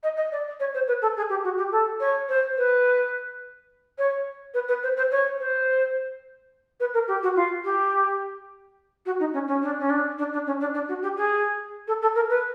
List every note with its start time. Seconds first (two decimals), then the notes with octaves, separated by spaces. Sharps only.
0.03 D#5
0.17 D#5
0.32 D5
0.60 C#5
0.74 C5
0.88 B4
1.02 A4
1.17 G#4
1.30 G4
1.44 F#4
1.58 G4
1.72 A4
2.00 C#5
2.29 C5
2.58 B4
3.98 C#5
4.54 B4
4.68 B4
4.83 C5
4.97 C5
5.11 C#5
5.40 C5
6.80 B4
6.94 A#4
7.08 G4
7.23 F#4
7.36 F4
7.64 G4
9.06 F#4
9.20 D#4
9.34 C#4
9.48 C#4
9.62 D4
9.79 C#4
9.90 D4
10.19 D4
10.33 D4
10.47 C#4
10.61 D4
10.74 D4
10.88 F#4
11.03 G4
11.17 G#4
11.88 A4
12.02 A4
12.15 A#4
12.30 B4